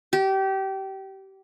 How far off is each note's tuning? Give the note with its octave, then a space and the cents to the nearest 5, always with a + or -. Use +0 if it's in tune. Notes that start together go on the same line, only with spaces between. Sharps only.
G4 -25